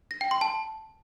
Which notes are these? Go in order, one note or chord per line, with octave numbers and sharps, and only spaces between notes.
A#6
G5
C6
A5